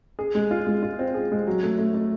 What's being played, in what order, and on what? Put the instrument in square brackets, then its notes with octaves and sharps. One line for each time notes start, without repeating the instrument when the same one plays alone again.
[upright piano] G#4
G#3
F4
G#3
F4
C4
G#4
G#3
F#3
A3
A3
A3